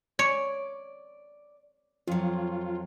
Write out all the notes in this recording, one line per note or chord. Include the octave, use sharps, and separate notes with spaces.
C#5 D5
F2 F#3 F4